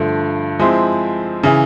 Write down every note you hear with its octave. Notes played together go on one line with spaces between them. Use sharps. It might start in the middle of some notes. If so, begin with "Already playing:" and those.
Already playing: G2 D3 F3 A3
F3 G#3 C4 E4
C#3 E3